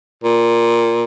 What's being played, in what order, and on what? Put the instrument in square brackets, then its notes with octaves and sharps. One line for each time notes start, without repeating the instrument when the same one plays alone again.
[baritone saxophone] A#2